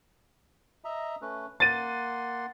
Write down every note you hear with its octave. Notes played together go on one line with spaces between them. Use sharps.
D#5 E5 A#5
A3 C#4 B4
A#3 F#5 C6 A6 D#7